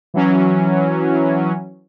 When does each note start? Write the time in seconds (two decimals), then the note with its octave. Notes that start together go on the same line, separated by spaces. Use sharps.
0.14 E3 F#3 C#4